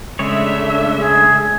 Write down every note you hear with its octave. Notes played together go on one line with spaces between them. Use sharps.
C#3 G#3 A3 D4 C#5 E5
G#4